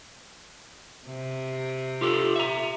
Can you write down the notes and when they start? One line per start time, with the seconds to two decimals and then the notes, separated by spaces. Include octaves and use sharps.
1.06 C3
2.01 F4 G4 A4
2.36 E5 A#5